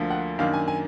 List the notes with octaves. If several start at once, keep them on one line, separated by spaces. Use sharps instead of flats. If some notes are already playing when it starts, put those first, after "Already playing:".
Already playing: D2 D3 F3 A#3
F#5
F#2 D#3 A#3 D4 F5
G#5
G#5